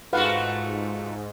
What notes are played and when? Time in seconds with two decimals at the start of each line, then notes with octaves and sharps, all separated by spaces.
0.13 G#2 A3 F4 F#4 B4 F5 F#5